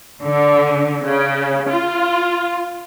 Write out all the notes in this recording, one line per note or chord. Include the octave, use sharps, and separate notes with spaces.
D3
C#3
F4